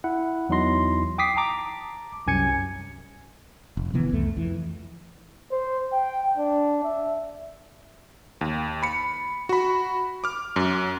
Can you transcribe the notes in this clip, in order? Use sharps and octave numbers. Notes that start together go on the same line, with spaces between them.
E4 F#5
E2 F#3 D#4 E4 C6 A#6
G5 D6 D#6 B6 C7
A5 A#5 D6
C2 F#2 G#5 G#6 C#7
F1
C3 D#3 E3 B3
C2 F2 A3
F2 E3
C5
G5
D4
E5
D#2
B5 C#7
F#4 B5
D6 F6
F#2